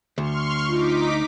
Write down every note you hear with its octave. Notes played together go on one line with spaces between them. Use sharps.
D2 C6 C#6 F6
D#4 F4 D6 B6